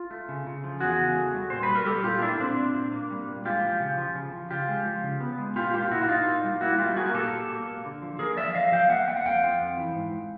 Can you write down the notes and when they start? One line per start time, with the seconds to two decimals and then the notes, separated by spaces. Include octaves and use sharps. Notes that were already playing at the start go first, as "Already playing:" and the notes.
Already playing: F4
0.11 A3
0.29 C#3
0.47 C#3
0.64 F3
0.80 E2 F#4 G#4
0.99 C#3
1.16 A3
1.34 G3
1.50 A#2 C5
1.63 B4
1.68 G3
1.75 A#4
1.86 G3 G4 A4
2.04 A#2 F4 G4
2.22 A#3 D4 E4
2.40 A#2 C4 D4
2.58 A#2
2.75 A#2
2.92 A#3
3.10 G3
3.28 A#2
3.45 G#3 F4 G4
3.62 F3
3.80 C#3
3.97 F3
4.15 C#3
4.33 F3
4.51 C#3 F4 G4
4.69 G#3
4.85 F3
5.04 C#3
5.20 B3
5.38 G#3
5.56 A#2 F4 G4
5.73 A#3 F4 G4
5.90 A#2 E4 F#4
6.02 F#4
6.08 A#2 D#4 F4
6.26 A#3
6.44 G3
6.61 A#3 E4 F#4
6.78 G3 F4 G4
6.96 A#3 F#4 G#4
7.06 A#4
7.14 A#2 G4 A4
7.32 A#2
7.49 A#3
7.67 A#3
7.85 D3
8.02 F3
8.19 A#3 G#4 A#4
8.37 F3 D5 E5
8.54 F3 D#5 F5
8.72 F3 F5 G5
8.89 A#3 E5 F#5
9.07 A#3 G5
9.17 F#5
9.25 F2 F5 G5
9.43 F3
9.61 F2
9.78 E3
9.96 G#2